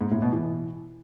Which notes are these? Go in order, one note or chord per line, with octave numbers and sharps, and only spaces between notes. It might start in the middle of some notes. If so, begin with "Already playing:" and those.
G#2
A2
B2
E3